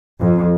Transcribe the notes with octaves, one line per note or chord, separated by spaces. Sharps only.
F2